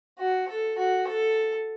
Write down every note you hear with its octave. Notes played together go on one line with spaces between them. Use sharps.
F#4
A4
F#4
A4